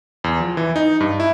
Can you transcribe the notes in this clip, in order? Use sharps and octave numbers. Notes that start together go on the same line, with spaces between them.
E2
F3
E3
D#4
G2
E4